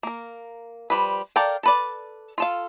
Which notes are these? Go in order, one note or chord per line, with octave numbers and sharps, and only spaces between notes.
A#3 A#4
F3 G3 B4
A4 A#4 D5 F5 G5
A4 B4 D5
F4 A4 F5